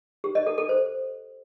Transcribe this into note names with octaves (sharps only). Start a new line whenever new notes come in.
G4
D#5
A4
A4
C5